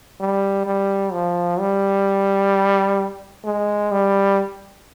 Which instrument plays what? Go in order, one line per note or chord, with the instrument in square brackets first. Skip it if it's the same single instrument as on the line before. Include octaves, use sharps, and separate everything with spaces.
[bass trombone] G3
G3
F3
G3
G#3
G3